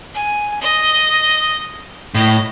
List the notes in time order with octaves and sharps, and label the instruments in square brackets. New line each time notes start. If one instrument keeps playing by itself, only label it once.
[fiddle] G#5
D#5
[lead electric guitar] A2 [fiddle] D#5